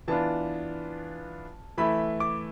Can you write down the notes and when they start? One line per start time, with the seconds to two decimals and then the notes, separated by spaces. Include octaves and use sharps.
0.08 E3 B3 D4 F4 A5
1.78 E3 A3 E4 B5
2.20 D6